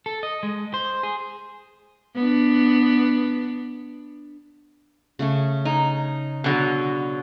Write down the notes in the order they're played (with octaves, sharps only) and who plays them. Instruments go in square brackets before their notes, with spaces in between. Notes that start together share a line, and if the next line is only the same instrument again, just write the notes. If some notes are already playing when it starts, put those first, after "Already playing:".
[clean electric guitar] A4
D#5
G#3
C5
G#4
[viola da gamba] B3 D4
[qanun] C#3 A3 C#4
[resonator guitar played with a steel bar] D#4 [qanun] G#5
[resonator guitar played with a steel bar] B2 D3 F#3